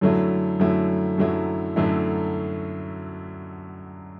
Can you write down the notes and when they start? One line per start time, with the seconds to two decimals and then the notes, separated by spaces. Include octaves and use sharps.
0.01 F#2 D3 F#3 A3 E4
0.60 F#2 D3 F#3 A3 E4
1.18 F#2 D3 F#3 A3 E4
1.76 F#2 D3 F#3 A3 E4